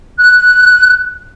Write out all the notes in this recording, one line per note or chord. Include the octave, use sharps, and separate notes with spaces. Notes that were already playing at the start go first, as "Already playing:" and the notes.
F#6